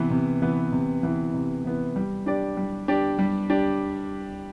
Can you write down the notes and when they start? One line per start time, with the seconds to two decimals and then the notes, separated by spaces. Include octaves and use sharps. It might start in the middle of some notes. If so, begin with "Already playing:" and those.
Already playing: C3 E3 B3
0.11 C3
0.42 E3 B3
0.72 C3
1.03 E3 B3
1.34 C3
1.65 E3 B3
1.96 G3
2.26 D4 G4 D5
2.57 G3
2.88 D4 G4 D5
3.19 G3
3.50 D4 G4 D5